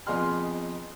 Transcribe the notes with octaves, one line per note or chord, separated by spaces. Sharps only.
F2 B3 G#4 D#5 C6 F6